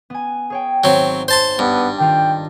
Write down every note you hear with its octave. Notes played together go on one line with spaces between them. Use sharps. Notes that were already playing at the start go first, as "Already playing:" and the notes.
B3 G#5
G#4 C#5 G5
G#1 F#3 C4
C5 A5 C6
G2 B3 D4
D#3 F4 G5